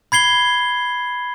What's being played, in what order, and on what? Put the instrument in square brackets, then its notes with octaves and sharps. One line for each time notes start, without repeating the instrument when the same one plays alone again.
[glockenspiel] B5 G#6 C7 G7